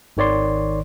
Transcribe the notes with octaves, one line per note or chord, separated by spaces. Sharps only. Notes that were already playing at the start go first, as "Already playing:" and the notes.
G#1 D#3 C#5 D5 C6